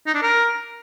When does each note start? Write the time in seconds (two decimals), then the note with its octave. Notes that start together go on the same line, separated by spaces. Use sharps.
0.06 D#4
0.14 D4
0.22 A#4